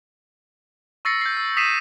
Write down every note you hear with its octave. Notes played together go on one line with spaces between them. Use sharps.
C#6 E6 A6 A#6 C7 C#7
G6 C7
E6
D#6 B6 C7 D#7 E7